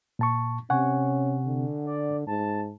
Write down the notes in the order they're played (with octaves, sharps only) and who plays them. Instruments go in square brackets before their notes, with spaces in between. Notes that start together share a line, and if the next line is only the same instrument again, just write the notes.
[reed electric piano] A#2 A5 C#6
[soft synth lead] C3 [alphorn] C#4 [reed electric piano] F#5 G#5 C#6
[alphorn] D3
[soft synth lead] D5
[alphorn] G#2 [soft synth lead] A5